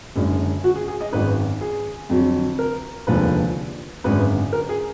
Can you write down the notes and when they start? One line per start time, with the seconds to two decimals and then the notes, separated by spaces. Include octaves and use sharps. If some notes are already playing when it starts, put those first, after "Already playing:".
0.16 F#1 F#2 D3 G#3
0.64 F#4
0.76 G#4
0.88 G#4
1.01 D#5
1.13 G#1 F#2 D#3 G#3 B4
1.61 G#4
2.10 F2 D3 F#3
2.59 A#4
3.07 F1 D#2 D3 F3 G#3 B4
4.04 G#1 F#2 D3 G#3 B4
4.53 A#4
4.69 G#4